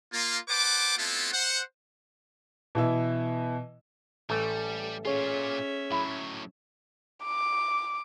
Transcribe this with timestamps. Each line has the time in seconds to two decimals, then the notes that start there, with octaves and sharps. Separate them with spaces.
0.13 A#3 F4
0.49 B4 C5 F#5 A5 D6
0.97 A3 B3 C4 E4 F4 A4
1.33 C5 F#5
2.75 B2 E3 E4
4.30 A1 G3 A3 A4
5.05 A#2 C#4 F4 G#4 C#5 E5
5.91 A2 F#3 E4
7.24 D6